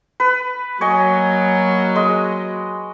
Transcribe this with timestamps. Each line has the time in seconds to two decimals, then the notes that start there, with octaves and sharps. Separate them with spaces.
0.20 B4
0.81 F#3 A#3 C#5 D#5 G#5
1.96 G#3 D#5